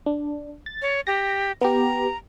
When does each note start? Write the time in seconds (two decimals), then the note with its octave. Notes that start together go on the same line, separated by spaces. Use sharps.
0.06 D4
0.66 A6
0.82 C#5
1.07 G4 A#6
1.61 B3 G4 A#5